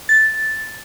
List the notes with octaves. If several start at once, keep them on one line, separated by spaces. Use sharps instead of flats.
A6